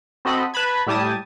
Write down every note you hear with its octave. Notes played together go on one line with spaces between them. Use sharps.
C4 F#4 A4 D#5 B5
B4 A5 B5 G#6
A2 G3 G4 G#5 A5 D#6